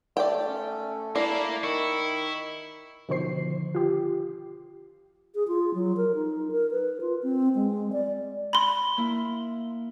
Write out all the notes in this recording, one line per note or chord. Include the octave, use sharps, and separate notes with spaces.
A3 D5 G5
C#4
A#3 D4 E4
D#3 E4 C#6
B2 D3 D#3 F3 C5 C7
F4 G4
G#4
F4
F#3
A#4
D#4
A#4
B4
F4
C4
G#3
D5
B5 C6
A#3 E4